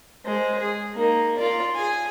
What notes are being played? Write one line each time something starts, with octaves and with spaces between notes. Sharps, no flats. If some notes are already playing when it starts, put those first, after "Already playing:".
G#3 C5
G#4
A#3 D#4
F4 D5
G#4 G#5